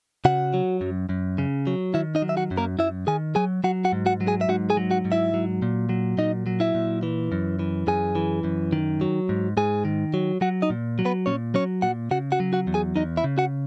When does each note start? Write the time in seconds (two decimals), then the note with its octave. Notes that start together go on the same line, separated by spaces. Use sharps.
0.25 C#3 F#4 F#5
0.54 F#3
0.81 F#2
1.09 F#2
1.38 C#3
1.67 F#3
1.94 D#3 E4 E5
2.15 D#4 D#5
2.22 F#3
2.29 E5
2.37 F#4 F#5
2.51 F#2
2.57 A#3 A#4
2.79 F#2 E4 E5
3.07 D#3 G#4 G#5
3.35 F#3 G#4 G#5
3.64 F#3 F#4 F#5
3.85 F#4 F#5
3.93 G#2
4.06 F#4 F#5
4.21 F#3
4.27 G#4 G#5
4.41 E5
4.49 G#2 F#4 F#5
4.70 G#4 G#5
4.77 F#3
4.91 F#4 F#5
5.05 G#2
5.12 E4 E5
5.34 F#3
5.62 A#2
5.89 F#3
6.18 A#2 D#4 D#5
6.47 F#3
6.60 E4 E5
6.75 A#2
7.03 E3
7.32 F#2
7.59 E3
7.87 F#2 G#4 G#5
8.15 E3
8.44 F#2
8.73 D#3
9.01 F#3
9.29 G#2
9.57 G#2 G#4 G#5
9.85 D#3
10.14 F#3
10.41 F#3 F#4 F#5
10.62 D#4 D#5
10.70 A#2
10.99 F#3
11.05 B3 B4
11.26 A#2 C#4 C#5
11.54 F#3 C#4 C#5
11.82 A#2 F#4 F#5
12.11 C#3 F#4 F#5
12.32 F#4 F#5
12.40 F#3
12.53 F#4 F#5
12.67 E2
12.74 G#4 G#5
12.96 E2 D#4 D#5
13.17 E4 E5
13.24 C#3
13.38 F#4 F#5